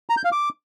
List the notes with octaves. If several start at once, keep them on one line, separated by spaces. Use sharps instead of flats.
A#5
G6
F5
D6